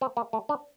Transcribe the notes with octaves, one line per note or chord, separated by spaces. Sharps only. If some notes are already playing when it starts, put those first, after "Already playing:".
C4
A#3
A3
D4